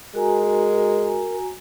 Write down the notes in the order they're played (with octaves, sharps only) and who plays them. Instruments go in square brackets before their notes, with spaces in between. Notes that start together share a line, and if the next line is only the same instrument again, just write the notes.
[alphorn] G#3 [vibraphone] F#4 G#5 A#5 [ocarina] A#4